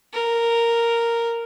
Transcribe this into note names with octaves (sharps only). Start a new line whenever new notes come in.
A#4